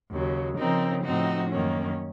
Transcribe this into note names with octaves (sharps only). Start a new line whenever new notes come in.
D#2 C#3 F#3
C#3 F3 C4 D#4 A#4
A2 F3 C4 D#4 F#4
F#2 D#3 A#3 C#4